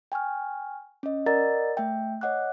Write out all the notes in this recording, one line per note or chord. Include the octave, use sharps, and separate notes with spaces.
G5 G#5 C#6 F6
C#4 D#5
A#4 D5 D#5 F#5 A#5 A6
A3 E5 G5
C#5 D#5 F#5 D6 F#6